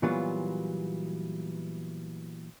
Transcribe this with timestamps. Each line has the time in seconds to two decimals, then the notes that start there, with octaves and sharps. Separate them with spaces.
0.02 A#2 E3 F#3 G3 B3 F4